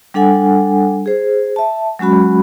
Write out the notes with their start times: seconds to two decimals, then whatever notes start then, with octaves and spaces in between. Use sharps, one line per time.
0.14 G3 D4 A4 F#5 G#5
1.06 G#4 C5
1.56 E5 A5
1.99 F#3 G#3 C#4 F#4 B5